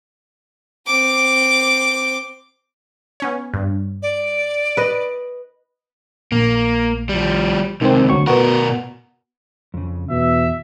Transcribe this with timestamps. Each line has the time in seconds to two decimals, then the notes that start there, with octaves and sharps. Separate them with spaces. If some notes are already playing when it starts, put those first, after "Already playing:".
0.87 C4 D6
3.20 B3 C#4 C#5
3.54 G2
4.03 D5
4.77 B4 D#5
6.32 A#1 A#3
7.09 F3 G3
7.81 C#2 C3 D#3 C4
8.09 D2 F#3 C#6
8.27 B2 B3 F#4 A#4
9.74 F2 C#3
10.10 E2 B2 E5